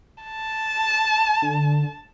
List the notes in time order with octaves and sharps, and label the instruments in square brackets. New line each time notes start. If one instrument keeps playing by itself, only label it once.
[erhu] A5
[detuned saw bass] D3